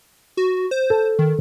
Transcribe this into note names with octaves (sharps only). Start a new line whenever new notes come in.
F#4
C5
A4
D#3